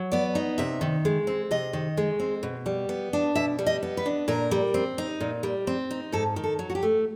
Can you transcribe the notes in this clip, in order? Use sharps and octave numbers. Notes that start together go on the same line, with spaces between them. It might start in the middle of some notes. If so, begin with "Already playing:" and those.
Already playing: F#3
B3 D5
D#4
C3 E5
D#3
G#3
C4
C3 D#5
D#3
G#3
C4
B2
G3
B3
D4
B2 E5
G3
D#5
B3
B4
D4
A#2 A#4
G3
C4
D#4
A#2
G3
C4
D#4
G#2 A4
D#3
A4
F#3
F#4
G4
A3